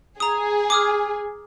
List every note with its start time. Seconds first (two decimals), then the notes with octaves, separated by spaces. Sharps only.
0.20 G#4 A#5 D#6
0.70 D6 D#6 F6